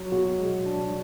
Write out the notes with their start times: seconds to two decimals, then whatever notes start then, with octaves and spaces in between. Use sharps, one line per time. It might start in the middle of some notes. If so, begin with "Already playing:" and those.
Already playing: F#3
0.12 B2 F#4
0.38 G#3
0.66 D4